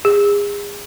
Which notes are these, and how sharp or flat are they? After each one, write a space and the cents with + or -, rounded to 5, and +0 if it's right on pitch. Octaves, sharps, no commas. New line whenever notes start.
G#4 -30